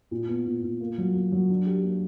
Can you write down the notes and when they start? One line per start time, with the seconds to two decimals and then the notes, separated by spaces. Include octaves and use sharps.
0.11 A#2
0.28 B3
0.46 A#2
0.63 A#2
0.81 A#3
0.98 F#3
1.15 A#3
1.32 F#3
1.50 D4
1.66 G4
1.84 A#3